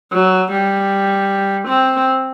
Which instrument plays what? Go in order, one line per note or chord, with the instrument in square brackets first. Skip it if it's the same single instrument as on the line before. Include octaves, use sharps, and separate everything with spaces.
[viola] F#3
G3
C4